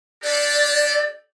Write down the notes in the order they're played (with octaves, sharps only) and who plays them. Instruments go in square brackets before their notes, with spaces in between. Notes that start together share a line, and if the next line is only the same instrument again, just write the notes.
[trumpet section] D4 G4 A4 [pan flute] D5